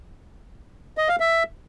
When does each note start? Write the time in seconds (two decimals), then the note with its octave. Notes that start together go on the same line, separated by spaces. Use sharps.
0.97 D#5
1.09 F5
1.20 E5